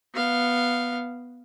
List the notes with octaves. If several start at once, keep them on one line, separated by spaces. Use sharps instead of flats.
B3 F5